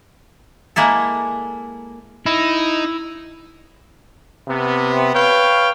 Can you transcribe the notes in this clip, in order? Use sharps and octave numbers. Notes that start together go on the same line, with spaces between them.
G#3 A#3 E4 A4
D#4 E4
C3 B3
B4 C#5 F5 G5